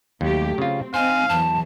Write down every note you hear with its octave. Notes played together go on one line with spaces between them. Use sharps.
D#2 F#3 A3 G4
C#3 C4 F4
C4 D#4 C5 F5 G#5
E2 E3 F#3 A5